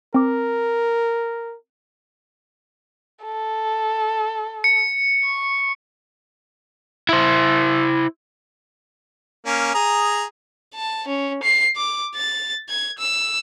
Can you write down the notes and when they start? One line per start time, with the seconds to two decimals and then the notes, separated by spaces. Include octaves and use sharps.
0.14 C4 A#4 D6
3.25 A4
4.64 C#7
5.24 C#6
7.09 E4 C5
9.46 A#3 C#4
9.74 G#4 A#5 D#6
10.75 A5
11.08 C#4
11.43 C7
11.76 D6
12.15 A6
12.69 G#6
12.99 E6